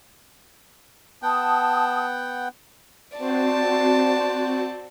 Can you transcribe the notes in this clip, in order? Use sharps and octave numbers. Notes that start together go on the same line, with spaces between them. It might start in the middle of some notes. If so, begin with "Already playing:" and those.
B3 F#5 G5 A5 D#6
C4 F#4 C5 D5 A5